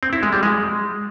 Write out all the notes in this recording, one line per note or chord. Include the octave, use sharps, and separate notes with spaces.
C4
E4
G#3
G3
G#3